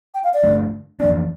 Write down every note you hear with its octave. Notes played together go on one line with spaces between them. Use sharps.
G5
F5
D5
G2 D3 A3 D4
F2 E3 A#3 D4 D5